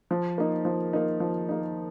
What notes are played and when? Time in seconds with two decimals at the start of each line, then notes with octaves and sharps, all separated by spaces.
0.11 F3
0.38 A#3 D#4
0.65 F3
0.93 A#3 D#4
1.20 F3
1.49 A#3 D#4